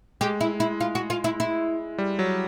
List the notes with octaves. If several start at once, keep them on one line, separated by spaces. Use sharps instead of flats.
G#3 G4
E4
E4
F4
F#4
F4
E4
E4
G3
F#3